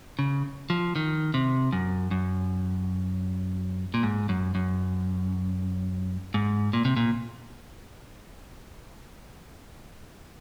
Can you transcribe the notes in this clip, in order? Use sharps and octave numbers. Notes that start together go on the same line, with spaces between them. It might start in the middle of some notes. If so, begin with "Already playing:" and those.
C#3
F3
D#3
C3
F#2
F#2
A#2
G#2
F#2
F#2
G#2
A#2
C3
A#2